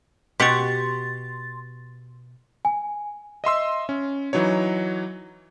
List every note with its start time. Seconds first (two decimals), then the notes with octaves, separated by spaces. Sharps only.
0.40 B2 G4 F#5 C6 C#6 A6 B6
2.65 G#5
3.44 D#5 E5 C6 E6
3.89 C#4
4.33 E3 F#3 D#4 C#5